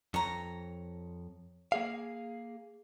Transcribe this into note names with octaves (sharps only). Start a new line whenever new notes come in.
F2 C#5 A#5
A#3 G#4 F5